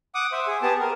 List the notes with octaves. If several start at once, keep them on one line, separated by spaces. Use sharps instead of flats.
F#5 D6 D#6
C5 E5
G#4
B3 G4 G#4 A5
A#4